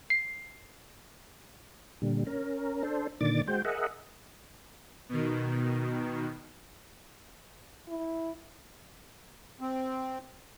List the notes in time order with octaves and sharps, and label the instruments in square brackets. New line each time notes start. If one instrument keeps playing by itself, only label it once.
[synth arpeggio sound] C7
[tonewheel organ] A#2 D3 G3
C#4 A#4
D4 A4 C5
A#2 D3 D#3 D5 D6 A6
G#3 F#4 C5 G5
G#4 A#4 D#5 E5 F#5
[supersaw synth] B2 D#3
[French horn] E4
[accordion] C4